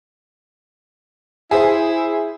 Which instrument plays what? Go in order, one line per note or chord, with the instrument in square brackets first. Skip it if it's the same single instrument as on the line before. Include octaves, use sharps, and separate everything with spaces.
[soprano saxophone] E4 [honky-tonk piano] G#4 C5